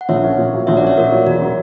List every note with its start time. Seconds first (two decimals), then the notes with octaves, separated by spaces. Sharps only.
0.01 F#5
0.09 A#1 C#5 E5
0.23 C#4
0.38 A#2
0.53 F#3
0.67 A#1 C#5 E5
0.77 D5 F#5
0.82 C#4 C#5 E5
0.97 A#2 A#4 C#5
1.12 F#3
1.26 E1 F#4
1.42 F#3